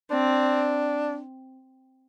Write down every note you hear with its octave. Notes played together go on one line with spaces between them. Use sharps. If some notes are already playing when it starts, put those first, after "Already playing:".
C4 D4